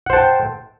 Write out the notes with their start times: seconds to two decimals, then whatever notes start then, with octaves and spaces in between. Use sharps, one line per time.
0.06 F#5
0.10 C5
0.13 A5
0.16 G5